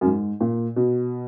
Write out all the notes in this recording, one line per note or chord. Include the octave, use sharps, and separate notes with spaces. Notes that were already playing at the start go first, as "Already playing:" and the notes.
F#2
G#2
A#2
B2